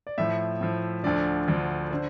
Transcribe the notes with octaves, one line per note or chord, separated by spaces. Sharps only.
D5
A2 F3 E5
A2 F3
D2 D3 F3 D5
D2 D3 F3
D3 C5